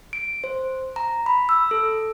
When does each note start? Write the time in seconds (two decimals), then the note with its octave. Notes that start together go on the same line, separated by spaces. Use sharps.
0.13 D7
0.44 C5
0.96 A#5
1.26 B5
1.49 E6
1.71 A4